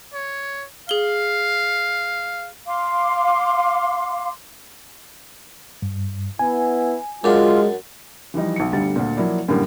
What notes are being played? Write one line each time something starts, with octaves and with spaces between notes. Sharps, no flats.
C#5
G#4 F5 G7
F5 C6 D6
G2
B3 E4 G#5
F#2 G#3 D4 F4
E3 F3 G3 D#4
B1 C#7
G1 D2 G3 A6
D2 A#2
F3 F#3 A#3 E4 D5
F#2 A2 D3 G3 A#3